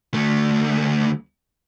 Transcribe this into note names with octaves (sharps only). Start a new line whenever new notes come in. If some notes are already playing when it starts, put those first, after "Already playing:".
D2 A3